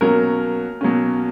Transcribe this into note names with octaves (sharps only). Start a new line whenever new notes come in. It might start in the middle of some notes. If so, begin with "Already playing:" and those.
B2 F#3 A#3 C#4 A#4
B2 F#3 A#3 C#4